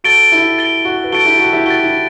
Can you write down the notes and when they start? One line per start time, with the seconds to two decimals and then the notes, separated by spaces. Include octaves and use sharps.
0.04 F#4 A4 A6 D7 G7
0.32 E4 G4
0.58 A6 D7 G7
0.85 F#4
1.04 B4
1.12 F#4 A4 A6 D7 G7
1.25 E4 G4
1.39 F#4 A4
1.53 E4 G4
1.66 F#4 A6 D7 G7
1.84 E4